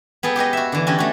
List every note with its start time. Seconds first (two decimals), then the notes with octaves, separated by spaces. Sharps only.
0.23 B3 G#4 A4 G5
0.36 G4 G#4 B4 D#5
0.53 F#4 E5
0.72 D3 E3
0.87 C#4 D4 G4 D#5
0.98 A3 F#4